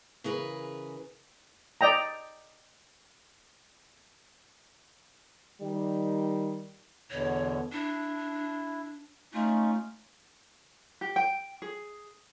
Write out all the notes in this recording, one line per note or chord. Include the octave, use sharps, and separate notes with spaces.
C#3 E3 G#4 A#4 B4
D5 D#5 G5 A#5
D#3 G3
E2 B2 D3 C#5
D4 E4
A3 C#4 D#4 F4
G4
G5
G#4